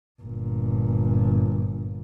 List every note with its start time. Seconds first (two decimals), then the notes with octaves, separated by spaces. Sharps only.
0.23 G1 A#2